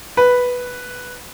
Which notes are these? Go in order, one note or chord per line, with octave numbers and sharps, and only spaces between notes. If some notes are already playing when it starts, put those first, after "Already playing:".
B4